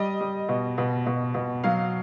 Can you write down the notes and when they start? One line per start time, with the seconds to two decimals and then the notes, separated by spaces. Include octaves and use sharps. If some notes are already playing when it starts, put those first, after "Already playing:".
Already playing: G3 D#5
0.21 G3
0.49 B2
0.78 B2
1.06 B2
1.34 B2
1.64 F#3 F5